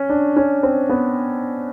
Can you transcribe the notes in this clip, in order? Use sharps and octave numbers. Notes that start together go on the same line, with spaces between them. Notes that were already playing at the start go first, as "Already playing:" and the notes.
Already playing: C#4
D4
C#4
C4
B3